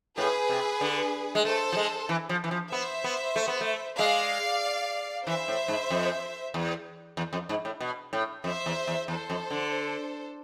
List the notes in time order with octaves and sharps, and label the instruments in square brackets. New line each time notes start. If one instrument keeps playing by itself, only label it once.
[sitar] A2 [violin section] G#4 B4
[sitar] C3
D3
G#3
[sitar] A3 [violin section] A4 C5
[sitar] F3
G#3
E3
F3
E3
F3
[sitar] B3 [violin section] C5 E5
[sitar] B3
A3
B3
A3
[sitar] G#3 [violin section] D5 F5
[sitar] E3 [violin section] C5 E5
[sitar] A2
G#2
F2
E2
E2
F2
G#2
A2
B2
A2
[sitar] F2 [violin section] C5 E5
[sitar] E2
E2
[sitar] E2 [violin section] A4 C5
[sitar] F2
D3